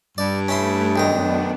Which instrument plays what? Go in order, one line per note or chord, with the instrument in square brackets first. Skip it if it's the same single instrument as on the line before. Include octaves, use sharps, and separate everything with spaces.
[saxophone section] G2 [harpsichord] D5
[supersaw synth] A3 [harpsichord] C#4 E4 C6
[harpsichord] B1 D#3 A#5 [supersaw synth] F#2 B3 D4